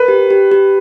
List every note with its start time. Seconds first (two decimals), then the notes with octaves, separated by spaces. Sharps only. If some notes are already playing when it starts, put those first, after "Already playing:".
Already playing: A#4 B4
0.08 G4
0.30 G4
0.52 G4